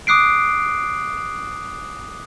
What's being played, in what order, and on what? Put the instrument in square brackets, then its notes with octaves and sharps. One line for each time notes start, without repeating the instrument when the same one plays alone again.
[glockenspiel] D6 D#6 F#6 C7 D7